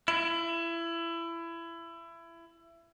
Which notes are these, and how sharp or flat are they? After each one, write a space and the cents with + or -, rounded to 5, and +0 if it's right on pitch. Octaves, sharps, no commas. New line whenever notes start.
E4 +25